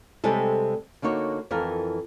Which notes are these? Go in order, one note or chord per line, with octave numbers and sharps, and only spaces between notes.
C3 G3 G#3 C4 G#4 A4
D3 A#3 D#4 F#4 C#5
F2 E3 F4 A4 A#4